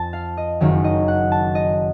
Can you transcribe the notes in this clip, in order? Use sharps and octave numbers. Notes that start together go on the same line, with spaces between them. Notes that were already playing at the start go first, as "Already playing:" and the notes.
Already playing: F2 A5
F5
D#5
F#1 F#2 D#3 F#3 C#5
D#5
F#5
A5
D#5